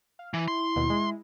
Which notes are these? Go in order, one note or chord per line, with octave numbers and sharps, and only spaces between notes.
F5
E3 E4
C6
D#2 B2
G#3